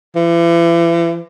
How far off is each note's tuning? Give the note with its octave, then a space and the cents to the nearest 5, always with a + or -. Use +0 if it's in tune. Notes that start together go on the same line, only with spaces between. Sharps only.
E3 +40